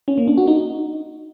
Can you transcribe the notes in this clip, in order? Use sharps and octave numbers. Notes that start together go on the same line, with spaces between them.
C#4
A#3
D4
F#4
D#4